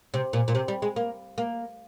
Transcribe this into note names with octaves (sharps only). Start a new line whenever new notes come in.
C3
A#2
A#2
C3
G3
G#3
A#3
A#3